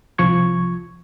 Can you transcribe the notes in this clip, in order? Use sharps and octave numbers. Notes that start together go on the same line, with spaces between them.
C2 F3 C#6 G#6